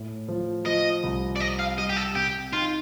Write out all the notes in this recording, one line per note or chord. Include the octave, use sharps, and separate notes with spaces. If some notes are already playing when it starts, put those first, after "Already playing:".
Already playing: A2
F3
F3 D#5
C2
D5
C4 D#5
F5
G3 D#5
G4
A4
C3 G4
D#4 F4